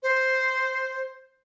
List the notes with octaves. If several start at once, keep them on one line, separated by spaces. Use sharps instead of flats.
C5